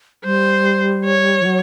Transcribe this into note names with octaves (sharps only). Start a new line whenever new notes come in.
G3 C5
C#5
F3
F#3